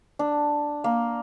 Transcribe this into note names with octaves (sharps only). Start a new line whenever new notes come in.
D4
A#3